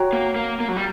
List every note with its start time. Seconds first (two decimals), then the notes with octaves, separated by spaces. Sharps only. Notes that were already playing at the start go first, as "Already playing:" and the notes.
Already playing: F#4 C#5 G5 A#5
0.13 A#3
0.36 A#3
0.60 A#3
0.68 F#3
0.77 G3